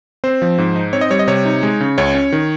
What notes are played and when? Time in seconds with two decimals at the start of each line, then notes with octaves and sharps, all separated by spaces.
0.24 C4 C5
0.42 F3
0.58 G#2
0.76 D#4
0.93 C4 C#5
1.01 D#5
1.10 G3 C#5
1.19 D#5
1.27 C3 C#5
1.45 D#4
1.63 G#3
1.81 C#3
1.98 C#2 C#5
2.15 C#4
2.32 D#3